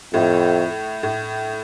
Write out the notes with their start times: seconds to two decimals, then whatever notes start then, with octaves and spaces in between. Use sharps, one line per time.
0.14 F2 A2
1.03 A2